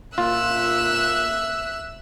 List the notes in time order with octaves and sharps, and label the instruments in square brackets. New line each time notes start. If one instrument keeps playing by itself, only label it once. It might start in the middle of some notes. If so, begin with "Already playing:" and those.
[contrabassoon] A#2 [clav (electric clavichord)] F4 [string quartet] E5 E6 F#6